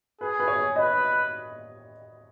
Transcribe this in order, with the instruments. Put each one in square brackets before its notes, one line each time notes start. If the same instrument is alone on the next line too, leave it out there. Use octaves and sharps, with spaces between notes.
[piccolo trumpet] G#4 [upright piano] B4
[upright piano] B4
C#5
[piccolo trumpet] B4 [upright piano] D#5